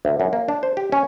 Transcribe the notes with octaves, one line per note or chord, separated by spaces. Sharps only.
D2
F#2
A#3
D4
C5
G4
C#4